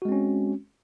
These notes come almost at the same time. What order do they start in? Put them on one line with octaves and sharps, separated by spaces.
F#4 G#3 C4 C#4